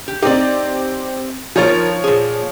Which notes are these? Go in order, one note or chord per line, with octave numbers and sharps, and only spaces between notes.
G4
C4 D#4 G4 D5
F3 D#4 F4 A#4 C#5 A6
A#2 G#4